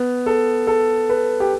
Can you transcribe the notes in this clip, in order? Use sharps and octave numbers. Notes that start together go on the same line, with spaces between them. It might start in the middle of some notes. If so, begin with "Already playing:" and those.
Already playing: B3
A4
A4
B4
G4